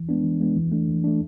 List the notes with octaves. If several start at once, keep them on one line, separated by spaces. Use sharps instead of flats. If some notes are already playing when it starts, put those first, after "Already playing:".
Already playing: E3
G#3 B3 D4
E3
G#3 B3 D4
E3
A3 D4
E3
A3 D4